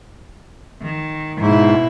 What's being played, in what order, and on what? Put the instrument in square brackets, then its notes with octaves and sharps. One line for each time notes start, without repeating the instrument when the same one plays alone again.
[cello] D#3
[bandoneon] G#2 [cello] B2 E4